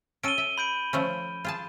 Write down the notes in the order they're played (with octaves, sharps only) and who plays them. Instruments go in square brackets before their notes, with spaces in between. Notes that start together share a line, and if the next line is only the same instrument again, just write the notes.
[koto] C#4 A4 [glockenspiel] D7 D#7 G7
[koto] E5
[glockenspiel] B5 G6 D7
[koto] F3 A3 C#4
F4 G#4 A5